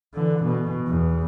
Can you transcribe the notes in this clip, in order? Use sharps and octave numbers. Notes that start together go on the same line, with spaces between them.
D3 E3
B2
E2